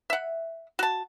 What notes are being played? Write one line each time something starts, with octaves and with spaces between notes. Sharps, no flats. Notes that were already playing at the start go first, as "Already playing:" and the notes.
E5 F#5
F#4 A5